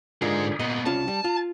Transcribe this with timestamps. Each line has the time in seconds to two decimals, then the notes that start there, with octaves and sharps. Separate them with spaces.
0.22 G#2 D3 F4 G#4 A#4
0.60 A#2 B3 D#5
0.86 C2 C#4 F4 A5
1.08 G3
1.24 F4